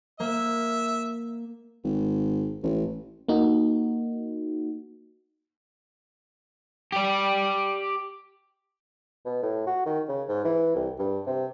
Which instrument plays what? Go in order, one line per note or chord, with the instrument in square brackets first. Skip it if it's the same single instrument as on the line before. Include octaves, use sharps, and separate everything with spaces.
[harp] A#3 [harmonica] E5
[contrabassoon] G#1
A1
[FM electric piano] A#3 D#4 F#4
[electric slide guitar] G4 D5
[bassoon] B2
A2
F#4
D#3
C#3
G#2
E3
C2
G2
C3